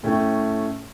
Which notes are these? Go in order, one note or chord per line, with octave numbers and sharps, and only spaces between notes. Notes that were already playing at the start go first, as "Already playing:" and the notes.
A2 A3 C#4 G5